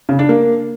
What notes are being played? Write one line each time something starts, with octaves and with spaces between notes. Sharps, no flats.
C#3
D4
A#3